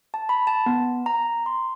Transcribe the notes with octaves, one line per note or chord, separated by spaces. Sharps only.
A5
B5
A5
B3
A#5
C6